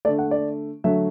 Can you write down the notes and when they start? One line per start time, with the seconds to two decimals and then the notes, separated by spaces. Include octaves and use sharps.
0.05 D3 A3 D5
0.19 F#5
0.31 D5
0.84 D3 F#3 A3 E5